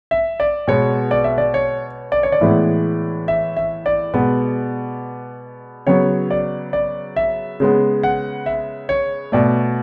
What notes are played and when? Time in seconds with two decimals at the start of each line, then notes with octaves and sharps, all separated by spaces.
0.11 E5
0.40 D5
0.68 B2 G#3 B3 C#5
1.11 D5
1.24 E5
1.38 D5
1.54 C#5
2.12 D5
2.23 C#5
2.32 D5
2.41 A2 E3 G#3 B3
3.28 E5
3.56 E5
3.86 D5
4.14 B2 G#3 B3
5.87 C#3 F#3 B3 C#5
6.31 D5
6.73 D5
7.16 E5
7.60 C#3 G#3 B3
8.03 F#5
8.46 E5
8.89 C#5
9.32 B2 A3 D5